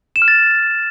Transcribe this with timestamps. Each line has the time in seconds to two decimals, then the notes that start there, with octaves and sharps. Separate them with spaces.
0.16 E7
0.22 F6
0.28 A6